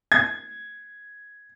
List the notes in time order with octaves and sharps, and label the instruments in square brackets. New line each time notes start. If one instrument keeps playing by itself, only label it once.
[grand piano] G#6